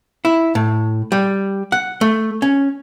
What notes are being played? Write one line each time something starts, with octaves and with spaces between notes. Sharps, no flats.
E4
A2
G3
F#5
A3
C#4